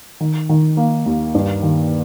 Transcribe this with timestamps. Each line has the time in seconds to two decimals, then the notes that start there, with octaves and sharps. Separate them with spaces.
0.20 D#3
0.49 D#3
0.77 A#3
1.06 D#2
1.35 G2
1.63 D#3